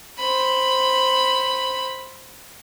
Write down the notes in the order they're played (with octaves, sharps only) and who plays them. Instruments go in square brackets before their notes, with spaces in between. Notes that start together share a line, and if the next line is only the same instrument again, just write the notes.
[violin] C5 B5